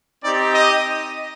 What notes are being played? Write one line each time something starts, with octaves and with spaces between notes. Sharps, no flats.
C4 D#4 G4 D5
D#5